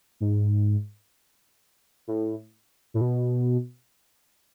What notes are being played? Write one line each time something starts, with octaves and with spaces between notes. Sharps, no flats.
G#2
A2
A2
B2